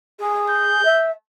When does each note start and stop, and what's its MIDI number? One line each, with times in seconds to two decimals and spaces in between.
0.19 0.84 68
0.50 1.08 91
0.85 1.11 76